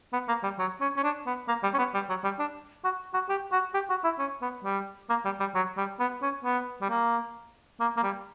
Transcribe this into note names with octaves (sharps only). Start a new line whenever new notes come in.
B3
A#3
G3
F#3
C#4
C#4
D4
B3
A#3
G3
C#4
B3
G3
F#3
G3
D4
F#4
F#4
G4
F#4
G4
F#4
E4
C#4
B3
G3
A#3
G3
G3
F#3
G3
B3
C#4
B3
G3
A#3
A#3
A#3
G3